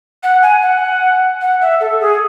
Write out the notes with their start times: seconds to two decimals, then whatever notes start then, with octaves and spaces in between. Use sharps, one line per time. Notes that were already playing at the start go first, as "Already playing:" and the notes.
0.23 F#5
0.42 G#5
0.62 F#5
1.41 F#5
1.61 E5
1.80 A4
2.00 G#4